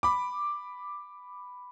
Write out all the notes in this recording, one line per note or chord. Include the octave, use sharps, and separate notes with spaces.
B5 D6